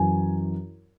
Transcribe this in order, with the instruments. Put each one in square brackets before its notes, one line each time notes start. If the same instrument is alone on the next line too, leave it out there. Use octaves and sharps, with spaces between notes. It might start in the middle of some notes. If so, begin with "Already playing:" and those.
Already playing: [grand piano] F#2 E3 G#5